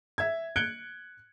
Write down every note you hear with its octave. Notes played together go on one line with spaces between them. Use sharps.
E5 G#6
F#6 G#6 C#7 D7 G7